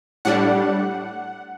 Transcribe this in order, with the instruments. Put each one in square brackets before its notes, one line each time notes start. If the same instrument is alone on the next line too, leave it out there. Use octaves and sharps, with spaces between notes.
[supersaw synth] A2 G3 D4 F#5